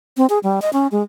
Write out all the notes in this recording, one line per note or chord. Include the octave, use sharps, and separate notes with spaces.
C4
G#4
G3
D#5
C#4
G#3